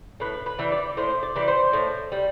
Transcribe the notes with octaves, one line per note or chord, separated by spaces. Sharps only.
A2 B4
B4
E3 G3
D5
A2 C5
D5
E3 G3
C5
A2
G3